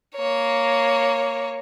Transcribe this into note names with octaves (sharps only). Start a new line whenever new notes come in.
A#3 C#5